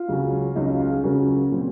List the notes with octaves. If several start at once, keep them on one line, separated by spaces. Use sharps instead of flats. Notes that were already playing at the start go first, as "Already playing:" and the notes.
Already playing: F4
C#2 C#3 F#3 C#4
C#2 C#3 F#3 C#4 D#4
F4
F4
G#4
C#2 C#3 F#3 C#4 A#4
A#2 F#3 C4